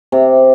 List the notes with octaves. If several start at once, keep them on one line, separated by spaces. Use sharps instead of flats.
C3